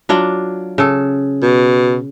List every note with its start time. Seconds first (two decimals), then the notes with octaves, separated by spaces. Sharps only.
0.09 F#3 D4 F4
0.78 C#3 A4
1.42 B2